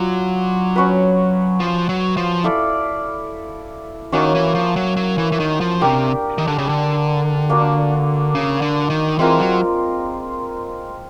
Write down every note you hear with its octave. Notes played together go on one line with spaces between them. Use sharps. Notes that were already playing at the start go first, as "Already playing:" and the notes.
Already playing: F#3 D4 F4
C#4 F#4 B4
F3
F#3
F3
E4 A4 D5 F5
D#3 A#3 C#4 F#4
E3
F3
F#3
F#3
E3
E3
D#3
F3
C3 D4 G4 A#4
D#3
D3
C#3
D3
A#3 D4 F#4
C#3
D3
D#3
E3 G#3 C4 F4 A#4
F#3